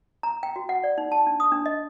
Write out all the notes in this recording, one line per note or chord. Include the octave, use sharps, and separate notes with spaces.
A#5
G5
F#4
F#5
D5
D#4
A5
D4
D#6
D4
D#5